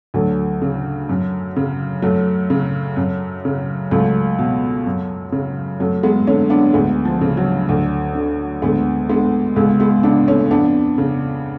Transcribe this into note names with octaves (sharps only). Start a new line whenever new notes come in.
D2 F#3 A3
C#3
F#2
C#3
F#2 F#3 A3
C#3
F#2
C#3
C#2 F#3 A3
B2
F#2
C#3
F#2 F#3 A3
G#3 B3
D3 A3 C#4
B3 D4
D2 G#3 B3
F3
C#3
F#3
D2
D3
D2 G#3 B3
D3 G#3 B3
C#2 G#3 B3
G#3 B3
C#3 B3 D4
A3 C#4
F2 B3 D4
C#3